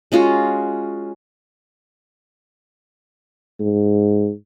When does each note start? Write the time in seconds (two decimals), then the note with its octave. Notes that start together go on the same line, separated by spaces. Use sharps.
0.12 G#3 C#4 F4 F#4
3.60 G#2